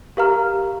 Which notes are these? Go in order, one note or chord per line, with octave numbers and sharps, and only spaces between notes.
G4 A#4 F5 A#5 F6